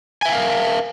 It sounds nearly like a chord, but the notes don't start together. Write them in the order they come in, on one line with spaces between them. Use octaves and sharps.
G#5 E5 G5 F5 A#4